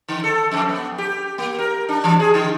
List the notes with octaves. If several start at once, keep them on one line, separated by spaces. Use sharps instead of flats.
D3
A4
F2
B3
G4
A#3
A#4
D4
E3
G#4
D3